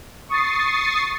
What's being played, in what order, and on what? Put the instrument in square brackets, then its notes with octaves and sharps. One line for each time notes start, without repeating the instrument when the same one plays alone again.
[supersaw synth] C#6 D#6 A6 C7